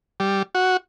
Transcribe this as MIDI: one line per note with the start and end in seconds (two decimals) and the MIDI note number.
0.20 0.43 55
0.55 0.77 66